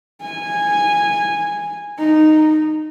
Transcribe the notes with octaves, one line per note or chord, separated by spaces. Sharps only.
G#5
D#4